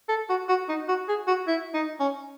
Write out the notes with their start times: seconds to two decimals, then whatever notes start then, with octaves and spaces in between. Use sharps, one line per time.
0.09 A4
0.30 F#4
0.49 F#4
0.69 D#4
0.89 F#4
1.09 G#4
1.28 F#4
1.48 E4
1.74 D#4
2.00 C#4